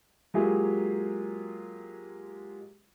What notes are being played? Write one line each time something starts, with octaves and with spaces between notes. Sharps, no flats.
F#3 G#3 A#3 F4 G4 G#4